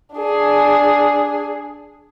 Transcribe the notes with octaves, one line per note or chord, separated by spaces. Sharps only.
D4 G#4